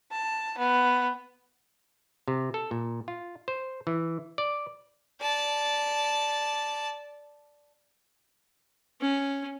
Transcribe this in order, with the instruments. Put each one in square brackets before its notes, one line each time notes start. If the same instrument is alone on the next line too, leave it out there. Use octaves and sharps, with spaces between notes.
[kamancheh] A5
B3
[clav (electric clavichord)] C3
A4
A#2
F4
C5
E3
D5
[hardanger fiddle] D5 A5
[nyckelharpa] C#4